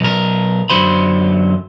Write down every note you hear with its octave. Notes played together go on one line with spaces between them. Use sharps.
B1 A#4
F#2 D3 F#3 C5 B5